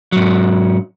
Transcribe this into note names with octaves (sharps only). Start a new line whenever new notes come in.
G#2 F#3